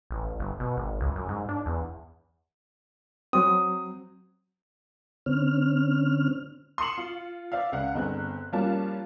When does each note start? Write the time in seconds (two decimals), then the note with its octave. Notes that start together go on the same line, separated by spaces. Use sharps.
0.11 A1
0.40 G1
0.60 B2
0.77 G#1
1.01 C#2
1.16 F#2
1.29 G#2
1.49 D4
1.66 E2
3.33 F#3 C4 D#6
5.26 D3 C4 C#4 F6
6.78 C6 D#6 C7 C#7 E7 F#7
6.98 F4
7.52 C5 D5 E5 F5
7.72 C#2 F5 F#5
7.95 G1 C4 G#4 F#6
8.52 F3 G3 A#3 C#4 F4 A5